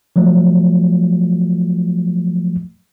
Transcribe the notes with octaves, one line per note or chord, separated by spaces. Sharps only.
F3 F#3 A3